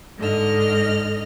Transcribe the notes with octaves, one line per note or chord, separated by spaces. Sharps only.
G#2 D3 D#5 F6